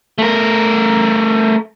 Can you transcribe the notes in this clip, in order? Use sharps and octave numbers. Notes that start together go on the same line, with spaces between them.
A3 A#4